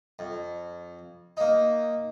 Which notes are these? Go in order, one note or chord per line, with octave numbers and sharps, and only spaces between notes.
F2
A#3 D#4